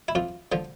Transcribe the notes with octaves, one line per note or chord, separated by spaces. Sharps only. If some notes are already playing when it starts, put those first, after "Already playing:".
E4
F2 F4
D3 F3